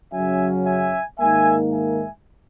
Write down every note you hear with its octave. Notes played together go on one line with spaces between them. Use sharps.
F#2 C#3 F#3 C#4 E5 G#5
E5 G#5
G#2 D#3 A#3 D#4 E5 G#5
E5 G#5